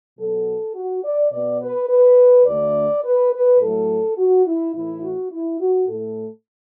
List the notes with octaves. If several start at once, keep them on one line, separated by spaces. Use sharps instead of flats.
B2 F#3 B3 A4
F#4
D5
B2 B3 D5
B4
B4
D2 D3 A3 D5
B4
B4
A2 F#3 A3 A4
F#4
E4
A2 E3 A3 E4
F#4
E4
F#4
A2 A3 A4